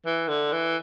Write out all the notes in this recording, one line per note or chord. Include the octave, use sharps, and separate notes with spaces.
E3
D3
E3